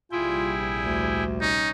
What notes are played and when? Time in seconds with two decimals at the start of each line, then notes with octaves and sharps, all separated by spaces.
0.12 A#1 C3 G3 E4 F4 G#4 G5
0.81 D2
1.41 C#4 D#4